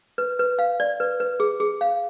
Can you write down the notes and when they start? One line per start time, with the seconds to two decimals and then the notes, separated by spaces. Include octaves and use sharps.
0.18 B4
0.39 B4
0.59 F5
0.80 D5
1.00 B4
1.20 B4
1.40 G#4
1.60 G#4
1.81 F5